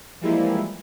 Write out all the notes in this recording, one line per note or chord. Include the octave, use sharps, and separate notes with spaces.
E3 F3 G3 G#3 A#3 E4